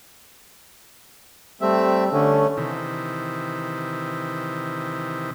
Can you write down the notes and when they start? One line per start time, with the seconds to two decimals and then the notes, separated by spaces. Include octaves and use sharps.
1.61 G3 A3 C4 E5
2.12 D3 A3 C#4
2.57 C3 D#3 E3